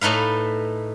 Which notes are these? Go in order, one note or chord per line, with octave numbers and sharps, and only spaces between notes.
A2 A3 D#4 B4 F5